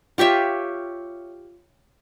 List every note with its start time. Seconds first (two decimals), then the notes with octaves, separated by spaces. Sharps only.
0.18 F4 G4 C#5 E5